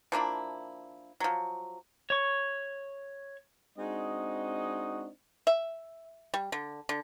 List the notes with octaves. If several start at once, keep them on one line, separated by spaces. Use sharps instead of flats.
F3 A#3 D4 E4
F3 F#3
C#5 C#6
G#3 C4 D4 D#4 F#4 D#5
E5
G3
D3
D3